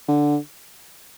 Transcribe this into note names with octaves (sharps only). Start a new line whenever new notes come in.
D3